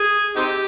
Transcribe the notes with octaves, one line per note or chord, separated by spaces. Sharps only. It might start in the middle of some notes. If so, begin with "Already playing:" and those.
Already playing: G#4
C4 D#4 G4